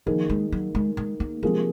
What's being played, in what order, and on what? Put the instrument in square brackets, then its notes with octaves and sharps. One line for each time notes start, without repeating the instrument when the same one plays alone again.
[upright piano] D#3 A#3 D#4 G#4 [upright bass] F3
[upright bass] G#3
F#3
G#3
G#3
A#3
[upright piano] C3 F3 A#3 F4 G#4 [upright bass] G#3